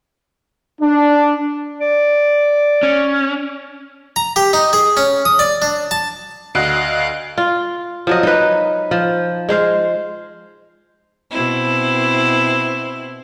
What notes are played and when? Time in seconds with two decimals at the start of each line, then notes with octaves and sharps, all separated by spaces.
0.81 D4
1.81 D5
2.83 C#4
4.16 A#5
4.36 G4
4.53 D#4
4.73 G#4
4.97 C#4
5.25 D#6
5.39 D5
5.62 D4
5.91 A5
6.55 D2 F#4 D#5 F5 F#6
7.38 F4
8.07 F3 F#3 D#5
8.23 D#4 B4
8.91 F3
9.49 G#3 C5 F5
11.30 B2 C4 E4